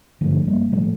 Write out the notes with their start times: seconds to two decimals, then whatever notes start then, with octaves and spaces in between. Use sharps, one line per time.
0.21 G2 D3 F3 A3
0.47 G3 A#3
0.72 A2 F3 A3